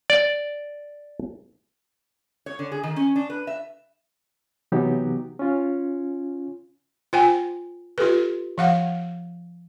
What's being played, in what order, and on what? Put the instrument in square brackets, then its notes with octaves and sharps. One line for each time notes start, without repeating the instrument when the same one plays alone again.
[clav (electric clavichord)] D5
[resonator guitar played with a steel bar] C#5
D3
G#4
D#3
C#4
D4
B4
E5
[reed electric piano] C3 E3 F#3 B3 D#4 G4
C#4 F4
[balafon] F4 C5 G5 G#5
F4 G4 A4 B4
F3 F5 F#5